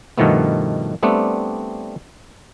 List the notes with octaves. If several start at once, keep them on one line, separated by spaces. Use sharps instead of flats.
G2 B2 D#3 F3 A3 B3
G3 A3 B3 C4 D4